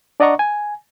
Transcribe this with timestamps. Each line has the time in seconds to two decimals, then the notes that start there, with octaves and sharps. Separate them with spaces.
0.20 D4 D5 D#5 F#5 A#5 C#6
0.39 G#5